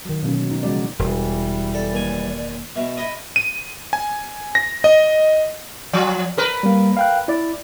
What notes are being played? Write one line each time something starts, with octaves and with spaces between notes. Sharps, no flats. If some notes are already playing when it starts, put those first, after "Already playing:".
D#3 F#3
B2 D3 D#3 F#3 A#3 C#4
D#4
C#3 F3 G#3 F#4 D5
E1 E3 G3
A4 D5
D#2 G#5
B2 E5
E4 D#5 D#6
D#7
G#5
A#6
D#5
F3
A#4 B4
G3 A#3
F5 G5 F#6
E4 D5